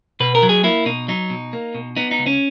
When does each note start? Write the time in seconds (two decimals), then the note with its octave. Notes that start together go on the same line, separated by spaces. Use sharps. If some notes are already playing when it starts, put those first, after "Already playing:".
0.20 B2 B4
0.35 A#4
0.42 F#3
0.49 G#4
0.64 A#3 E4
0.86 B2 D#4
1.08 F#3 D#4
1.30 B2
1.53 A#3
1.75 B2
1.96 B3 D#4
2.11 D#4
2.19 C#2
2.26 C#4